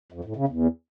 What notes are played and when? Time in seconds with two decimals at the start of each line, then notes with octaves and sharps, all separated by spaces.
0.12 F2
0.24 A2
0.36 C#3
0.48 E2